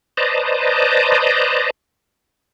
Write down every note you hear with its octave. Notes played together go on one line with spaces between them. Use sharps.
B4 C5 D5 D#5 A5 A#5